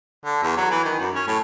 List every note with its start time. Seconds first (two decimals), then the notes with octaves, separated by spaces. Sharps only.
0.25 D3
0.43 E2
0.57 F#3
0.71 E3
0.85 D#3
0.99 F#2
1.15 C#4
1.27 A2